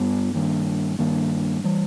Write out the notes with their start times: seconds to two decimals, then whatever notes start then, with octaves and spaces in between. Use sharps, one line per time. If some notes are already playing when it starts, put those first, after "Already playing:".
Already playing: G2 G3 B3
0.34 G2 D#3 A#3
0.99 G2 D#3 A#3
1.64 E3 G3